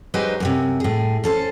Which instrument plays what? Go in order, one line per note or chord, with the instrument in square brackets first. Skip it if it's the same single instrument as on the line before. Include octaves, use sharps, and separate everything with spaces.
[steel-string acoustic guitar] F#3 G#3 D#4 G4 B4 C5
F#2 A2 C3
A2 G#4
C#4 A4 C5